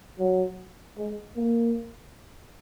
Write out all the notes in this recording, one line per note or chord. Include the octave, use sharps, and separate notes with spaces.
F#3
G#3
A#3